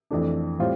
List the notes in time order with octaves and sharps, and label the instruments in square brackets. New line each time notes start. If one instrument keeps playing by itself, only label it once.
[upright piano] F2 E3 A3 D4
A2 G3 C4 F4